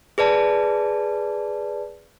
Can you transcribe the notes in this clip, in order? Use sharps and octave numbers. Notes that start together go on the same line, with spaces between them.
G#4 B4 D5 A5